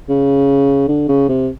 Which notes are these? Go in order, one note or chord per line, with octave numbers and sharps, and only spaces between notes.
C#3
D3
C#3
C3